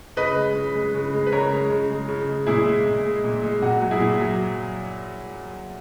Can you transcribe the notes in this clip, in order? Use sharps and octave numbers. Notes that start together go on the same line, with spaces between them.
C#3 B4 D#5
G#3
C#3
G#3
C#3
G#3
B4
C#3 A#4 C#5
G#3
C#3
G#3
C#3
G#3
A#2 E4 G#4
G#3
A#2
G#3
A#2
G#3
A#2 F#4
F#3
E4 G#4
A#2
F#3